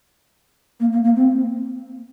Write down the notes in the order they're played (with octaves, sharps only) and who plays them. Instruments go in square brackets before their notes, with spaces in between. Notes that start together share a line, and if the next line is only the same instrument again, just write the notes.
[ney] A#3
A#3
A#3
C4